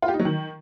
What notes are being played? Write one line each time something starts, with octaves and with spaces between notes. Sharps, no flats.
F4
G4
D#4
F#3
D#3